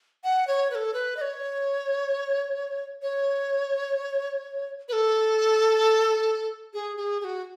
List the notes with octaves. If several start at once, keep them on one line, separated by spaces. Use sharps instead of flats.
F#5
C#5
B4
A4
B4
D#5
C#5
C#5
B4
A4
G#4
G#4
G#4
F#4